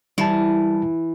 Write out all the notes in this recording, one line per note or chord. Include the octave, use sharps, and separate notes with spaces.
E3 G3 E4 A5